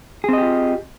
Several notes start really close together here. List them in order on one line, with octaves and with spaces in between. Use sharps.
G#4 C4 D#5 G4 F4